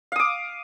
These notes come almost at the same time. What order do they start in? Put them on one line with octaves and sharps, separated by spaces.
F5 D#6 D6